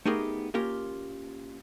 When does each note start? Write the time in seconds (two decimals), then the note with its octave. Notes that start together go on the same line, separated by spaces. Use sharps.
0.05 A3 B3 D#4 G4 G#4 A#4
0.54 A#3 C#4 F4 G4 A#4